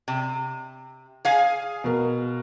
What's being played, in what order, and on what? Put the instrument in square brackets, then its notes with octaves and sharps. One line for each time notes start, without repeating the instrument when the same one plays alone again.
[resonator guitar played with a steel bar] C3
G#4 F5 G#5
[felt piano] B2 A#4